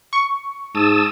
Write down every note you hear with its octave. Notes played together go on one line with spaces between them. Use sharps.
C#6
G#2 A5 D#6 E6